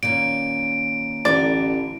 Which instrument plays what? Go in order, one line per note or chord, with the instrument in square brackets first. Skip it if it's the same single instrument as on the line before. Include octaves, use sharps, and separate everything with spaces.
[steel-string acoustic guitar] A#2 D#3 C#4 [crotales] D7
[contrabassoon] A1 [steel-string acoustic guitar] D3 E3 A#4 [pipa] D5